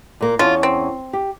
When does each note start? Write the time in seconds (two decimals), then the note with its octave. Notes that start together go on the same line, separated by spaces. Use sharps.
0.21 A#2 A#3
0.39 E2 C#4 F4 A5
0.63 C4
1.13 G4